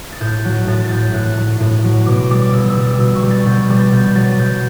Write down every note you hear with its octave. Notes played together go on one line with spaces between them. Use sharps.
A6
A2 G6
F#3 F#6
A2 A6
A6
F#3 G6
A2 F#6
F#3
A2
F#3
B2 D6
G3 D6
B2 E6
E6
G3
E6
B2 E6
C#6
G3
A6
B2 G6
G6
G3
A6
B2 G6
F#3 A6
B2 G6